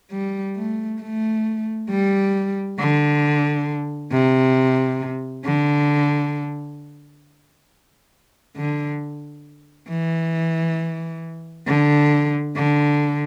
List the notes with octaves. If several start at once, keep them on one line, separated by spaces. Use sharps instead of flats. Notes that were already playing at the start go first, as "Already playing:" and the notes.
G3
A3
A3
G3
D3
C3
D3
D3
E3
D3
D3